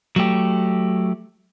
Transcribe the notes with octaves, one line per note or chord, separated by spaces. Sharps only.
F#3 A3 G4